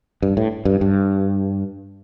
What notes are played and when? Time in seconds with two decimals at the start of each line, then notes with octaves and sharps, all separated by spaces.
0.22 G2
0.37 A2
0.65 G2
0.81 G2